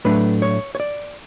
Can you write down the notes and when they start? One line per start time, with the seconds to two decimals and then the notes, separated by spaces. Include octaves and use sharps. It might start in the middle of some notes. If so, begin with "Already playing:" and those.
0.05 A2 F#3 A3 D4 B4
0.42 C#5
0.75 C#5
0.80 D5